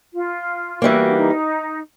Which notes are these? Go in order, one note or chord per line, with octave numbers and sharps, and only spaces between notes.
F4
E3 G3 A#3 F#4
D4
D#4